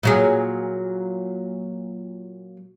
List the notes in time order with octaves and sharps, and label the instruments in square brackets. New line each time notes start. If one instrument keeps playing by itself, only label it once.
[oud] A#2 F#3 G#4